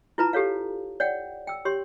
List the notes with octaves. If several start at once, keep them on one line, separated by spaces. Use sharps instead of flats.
E4 F4 B4 A5 A#5
G4 A4 C#5 F5
C#5 D5 F#5 G5
G5 E6
G4 C#5 C6